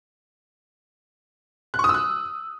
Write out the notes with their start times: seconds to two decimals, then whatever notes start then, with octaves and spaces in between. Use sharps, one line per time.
1.74 F#6
1.79 C#6
1.84 D#6
1.89 E6
1.94 F#6